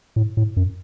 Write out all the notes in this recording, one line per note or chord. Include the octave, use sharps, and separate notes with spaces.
A2
A2
F#2